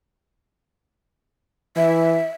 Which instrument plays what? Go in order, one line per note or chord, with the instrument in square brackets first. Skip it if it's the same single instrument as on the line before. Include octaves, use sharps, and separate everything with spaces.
[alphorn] E3 [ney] E5